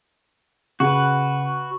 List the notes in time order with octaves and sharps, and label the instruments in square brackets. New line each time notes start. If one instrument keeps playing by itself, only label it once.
[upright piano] C#3 [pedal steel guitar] F#4 B4